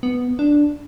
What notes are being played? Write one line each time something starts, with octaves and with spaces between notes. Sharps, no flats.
B3
D4